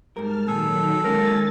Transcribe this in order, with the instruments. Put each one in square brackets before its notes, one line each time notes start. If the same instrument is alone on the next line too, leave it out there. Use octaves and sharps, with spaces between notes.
[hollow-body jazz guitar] G#2 G3 A#4 [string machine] A5 F6
[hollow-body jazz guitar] A#2 G#4 [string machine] D#3 F#3 [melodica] A4
[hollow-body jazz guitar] G#3 A#3 C#4 [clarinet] A#4 [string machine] G#5 A6